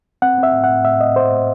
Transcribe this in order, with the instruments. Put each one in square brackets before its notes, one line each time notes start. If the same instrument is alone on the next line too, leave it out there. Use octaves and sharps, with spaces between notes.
[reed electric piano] C4 F#5
C4 E5
A2
F#5
A2
A2 E5
A2 D#5
A2 C5
A2